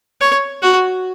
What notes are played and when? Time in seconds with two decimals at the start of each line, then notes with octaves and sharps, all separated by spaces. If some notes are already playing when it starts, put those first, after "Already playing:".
0.21 C#5
0.62 F#4